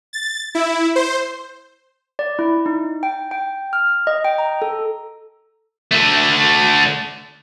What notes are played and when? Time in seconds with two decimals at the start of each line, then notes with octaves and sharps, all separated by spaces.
0.13 A6
0.55 E4
0.96 C5
2.19 D5
2.39 E4
2.66 D#4
3.03 G5
3.31 G5
3.73 F6
4.07 D#5
4.24 G5
4.38 A#5
4.62 A4
5.91 D3 A3